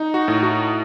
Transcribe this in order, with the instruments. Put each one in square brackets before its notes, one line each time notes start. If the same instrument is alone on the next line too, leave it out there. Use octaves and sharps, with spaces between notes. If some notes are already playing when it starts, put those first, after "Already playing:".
Already playing: [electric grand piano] D#4
F#4
A2
F#4